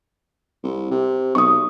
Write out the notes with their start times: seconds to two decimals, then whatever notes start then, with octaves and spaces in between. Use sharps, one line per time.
0.64 C2
0.91 C3
1.35 B1 C#6 D#6